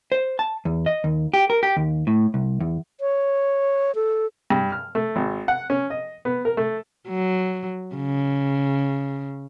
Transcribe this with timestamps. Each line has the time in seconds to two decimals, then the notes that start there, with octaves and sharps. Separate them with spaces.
0.12 C5
0.39 A5
0.65 E2
0.86 D#5
1.04 D#2
1.34 G4
1.50 A#4
1.63 G4
1.77 D#2
2.07 A2
2.34 C2
2.60 E2
3.00 C#5
3.95 A4
4.50 G2
4.72 F6
4.95 A3
5.16 G#1
5.48 F#5
5.70 C#4
5.90 D#5
6.25 B3
6.45 A#4
6.57 A3
7.08 F#3
7.96 C#3